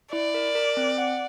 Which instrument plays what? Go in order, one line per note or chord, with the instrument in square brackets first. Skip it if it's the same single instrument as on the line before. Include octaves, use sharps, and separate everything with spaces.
[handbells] E4 [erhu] D5
[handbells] A#4
A#4
C4
F#5